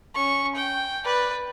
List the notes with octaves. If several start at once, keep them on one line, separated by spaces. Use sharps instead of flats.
C#4 C#6
G5
B4 D5